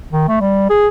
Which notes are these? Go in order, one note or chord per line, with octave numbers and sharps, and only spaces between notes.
D#3
A3
G3
G#4